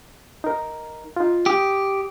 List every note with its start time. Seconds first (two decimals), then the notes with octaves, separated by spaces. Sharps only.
0.44 D#4 A#4
1.16 D#4 F4
1.46 G4 D#6